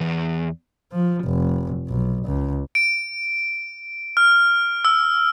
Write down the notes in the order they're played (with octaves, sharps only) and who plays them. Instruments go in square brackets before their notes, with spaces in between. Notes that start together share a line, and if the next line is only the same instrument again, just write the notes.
[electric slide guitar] E2
[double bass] F3
F1
B1
C#2
[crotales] D7
F6
E6